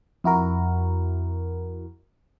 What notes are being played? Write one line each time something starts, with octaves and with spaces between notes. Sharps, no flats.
F2 E4 F#4 A#4